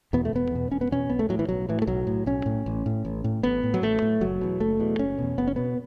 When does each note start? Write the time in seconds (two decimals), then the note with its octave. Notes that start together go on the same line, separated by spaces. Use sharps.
0.13 E2 B2 B3
0.25 A3
0.33 E1 B3
0.51 E2 B2
0.71 E1 C#4
0.81 B3
0.91 E2 B2 C#4
1.10 B1 B3
1.19 A3
1.29 A2 F#3
1.39 E3
1.49 B1 F#3
1.69 A2 E3
1.82 A3
1.87 B1 F#3
2.07 A2
2.26 B1 C#4
2.46 A2
2.66 A1
2.86 A2
3.05 A1
3.24 A2
3.43 A1 B3
3.63 A2
3.74 F#3
3.82 A1 A3
4.02 A2
4.21 F#1 F#3
4.41 E2 B2
4.60 F#1 A3
4.80 E2 B2
4.99 F#1 C#4
5.18 E2 B2
5.38 F#1 B3
5.47 C#4
5.56 B2 B3